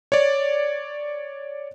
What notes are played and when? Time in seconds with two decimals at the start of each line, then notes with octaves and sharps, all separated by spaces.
0.12 C#5 D5